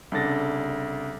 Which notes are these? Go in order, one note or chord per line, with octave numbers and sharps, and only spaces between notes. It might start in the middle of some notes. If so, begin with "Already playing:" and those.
C2 C#3 D4 A4 A6 A#6